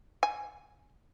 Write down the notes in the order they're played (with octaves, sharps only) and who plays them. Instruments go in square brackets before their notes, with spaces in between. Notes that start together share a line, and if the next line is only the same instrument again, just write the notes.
[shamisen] G#5